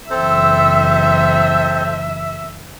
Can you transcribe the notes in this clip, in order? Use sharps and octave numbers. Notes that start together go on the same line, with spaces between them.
F#1 E3 C4 A4 C5 E5